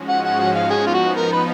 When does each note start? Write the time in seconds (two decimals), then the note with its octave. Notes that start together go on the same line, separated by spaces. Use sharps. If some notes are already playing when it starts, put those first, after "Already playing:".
Already playing: G#2 F3 G#3 C#4 F#4
0.09 F#5
0.25 F#5
0.40 F#5
0.55 F5
0.71 F3 B3 D#4 G#4
0.87 F4
0.94 F#4
1.17 A#4
1.33 B4